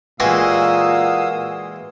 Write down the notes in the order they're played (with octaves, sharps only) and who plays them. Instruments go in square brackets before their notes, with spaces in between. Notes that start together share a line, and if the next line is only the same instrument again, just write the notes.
[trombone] A#2 [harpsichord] E3 G#3 G4 [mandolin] F#4 [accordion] F5 D#6 E6